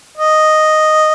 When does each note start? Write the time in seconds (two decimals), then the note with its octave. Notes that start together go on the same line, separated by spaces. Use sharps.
0.18 D#5